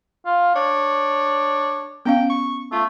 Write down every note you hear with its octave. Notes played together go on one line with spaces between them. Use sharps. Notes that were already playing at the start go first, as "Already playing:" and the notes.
F4
D4 C#5
B3 C#4 F5 G5
C#6
A3 F4